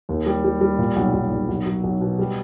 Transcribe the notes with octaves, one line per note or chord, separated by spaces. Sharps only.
D#2
G3
G3
G3
A#2
B1
B1
B1
B1
F#3
B1
B2
G3